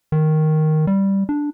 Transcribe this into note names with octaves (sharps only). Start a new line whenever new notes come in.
D#3
G3
D4